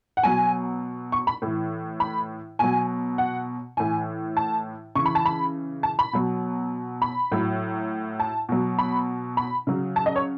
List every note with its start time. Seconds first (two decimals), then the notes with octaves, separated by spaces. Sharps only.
0.17 F#5
0.23 B2 F#3 G#5
1.12 C#6
1.27 B5
1.42 A2 E3
2.00 B5
2.59 B2 F#3 G#5
3.18 F#5
3.77 A2 E3 G#5
4.37 A5
4.95 C#3 E3 C#6
5.06 B5
5.15 A5
5.26 B5
5.83 A5
5.99 B5
6.13 B2 F#3
7.02 B5
7.32 A2 F#3
8.20 A5
8.49 B2 F#3
8.79 B5
9.37 B5
9.67 C#3 F#3
9.96 A5
10.06 D#5
10.16 C#5